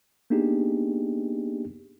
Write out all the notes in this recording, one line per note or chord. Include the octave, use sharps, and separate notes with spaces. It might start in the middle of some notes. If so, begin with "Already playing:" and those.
A#3 B3 D4 D#4 G4 G#4